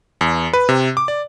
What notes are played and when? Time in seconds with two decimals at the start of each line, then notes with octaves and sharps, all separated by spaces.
0.21 E2
0.53 B4
0.69 C3
0.97 D6
1.08 D5